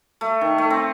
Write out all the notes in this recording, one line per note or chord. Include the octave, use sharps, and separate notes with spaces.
A3
D#3
A3
C4